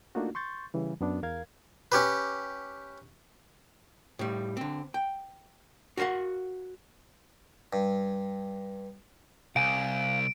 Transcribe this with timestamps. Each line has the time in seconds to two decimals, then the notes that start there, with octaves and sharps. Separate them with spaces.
0.15 A3 A#3 D4 D#4 F4 F#4
0.35 C6 C#6 G6 A6
0.74 C#3 E3 G3
1.01 F#2 B3 D4
1.23 E2 A#4 F5 G#6
1.92 C#4 G4 B4
4.19 A2 G3
4.57 D3 C4
4.94 G5
5.97 F#4 A#4 B4 F5 F#5
7.73 G2
9.56 C2 F5 G#5 D7